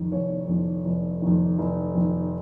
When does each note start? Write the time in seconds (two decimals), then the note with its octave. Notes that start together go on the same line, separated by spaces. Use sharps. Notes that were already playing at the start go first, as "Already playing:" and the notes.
Already playing: F1 F2 D#3
0.12 F1 C#5
0.48 F2 D#3
0.85 F1
1.22 F2 D#3
1.58 F1
1.95 F2 D#3